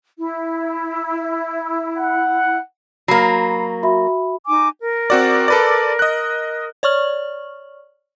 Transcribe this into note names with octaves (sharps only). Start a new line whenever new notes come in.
E4
F#5
F#3 A#3 B5 C7
F#4 E5 B5
D#4 G#5 D6
A#4
C4 F#4 D5
A4 B4 D5
D#5 F#6
C#5 D5 C#6 F6 F#7